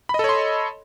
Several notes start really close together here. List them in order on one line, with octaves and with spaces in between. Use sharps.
B5 D#5 A4 C#5 C6